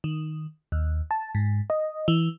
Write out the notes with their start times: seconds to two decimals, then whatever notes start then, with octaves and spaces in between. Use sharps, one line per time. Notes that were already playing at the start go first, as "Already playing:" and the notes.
0.04 D#3
0.72 D#2
1.11 A5
1.35 G#2
1.70 D#5
2.08 E3